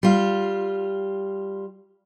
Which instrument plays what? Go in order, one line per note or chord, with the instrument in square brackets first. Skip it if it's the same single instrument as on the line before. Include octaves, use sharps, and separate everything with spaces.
[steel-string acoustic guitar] G3 F4